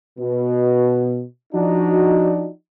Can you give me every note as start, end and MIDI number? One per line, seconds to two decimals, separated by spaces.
0.18 1.23 47
1.53 2.47 53
1.53 2.47 62
1.53 2.47 63
1.53 2.47 66